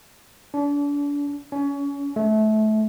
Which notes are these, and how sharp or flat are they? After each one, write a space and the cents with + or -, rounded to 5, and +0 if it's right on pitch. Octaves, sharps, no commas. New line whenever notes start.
D4 -35
C#4 +30
A3 -25